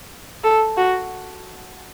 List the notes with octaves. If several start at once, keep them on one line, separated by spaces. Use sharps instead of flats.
A4
F#4